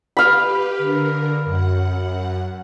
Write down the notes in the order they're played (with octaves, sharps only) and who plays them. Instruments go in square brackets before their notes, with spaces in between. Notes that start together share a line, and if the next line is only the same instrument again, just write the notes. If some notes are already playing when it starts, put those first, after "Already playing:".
[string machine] G4 B4 [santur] F5 B5
[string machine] D3 A#4
F#2 F#5